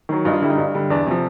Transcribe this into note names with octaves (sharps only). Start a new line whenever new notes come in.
D#3 F#3
G2 D#4
F4
D3 G3 E4
D#4
G2
D3 G3
E2 D4
C3 F3